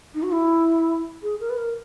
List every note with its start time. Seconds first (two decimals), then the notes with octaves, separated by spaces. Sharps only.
0.15 D#4
0.23 F#4
0.32 E4
1.23 G#4
1.40 A#4
1.50 B4
1.57 A#4